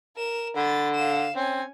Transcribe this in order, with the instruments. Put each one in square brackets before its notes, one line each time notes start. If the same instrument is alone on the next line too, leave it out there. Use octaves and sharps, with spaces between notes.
[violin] A#4 E7
[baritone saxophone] D3 [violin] B5 A6
[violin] F5 E7
[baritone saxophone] C4 [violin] C#4 G#5